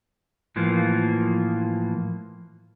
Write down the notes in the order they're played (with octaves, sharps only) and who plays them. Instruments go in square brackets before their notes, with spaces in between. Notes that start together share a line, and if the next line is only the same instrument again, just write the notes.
[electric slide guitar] A2 E3 F3 A#3